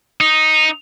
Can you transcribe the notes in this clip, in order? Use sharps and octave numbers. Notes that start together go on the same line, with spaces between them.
D#4